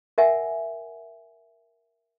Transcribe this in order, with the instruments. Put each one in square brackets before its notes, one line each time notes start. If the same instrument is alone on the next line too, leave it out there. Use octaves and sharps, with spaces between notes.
[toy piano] A#4 E5 F#5 G#5